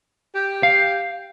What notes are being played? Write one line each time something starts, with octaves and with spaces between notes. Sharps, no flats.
G4
F5